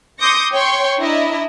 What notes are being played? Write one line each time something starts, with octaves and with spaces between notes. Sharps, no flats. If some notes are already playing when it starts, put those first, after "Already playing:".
C6 D6 D#6 G6 A#6 C#7
C#5 G5 C6 C#6
D4 E4 D#5 E5 A#5